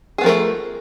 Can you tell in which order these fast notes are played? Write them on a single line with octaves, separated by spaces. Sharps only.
G#4 B3 F3 A#4 A3